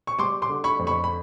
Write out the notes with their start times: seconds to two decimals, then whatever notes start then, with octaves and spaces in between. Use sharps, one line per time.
0.07 C#6
0.19 G3 C6 D6
0.42 C6 D6
0.49 D3
0.64 B5 C#6
0.79 F2
0.87 B5 C#6
1.04 B5